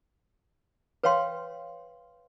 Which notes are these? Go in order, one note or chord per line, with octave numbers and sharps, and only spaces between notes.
B4 C#5 F5 G5 C6